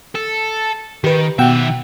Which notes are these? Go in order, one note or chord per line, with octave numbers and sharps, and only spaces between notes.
A4
D#3 G4 B4
B2 D#3 E5 F#5 G5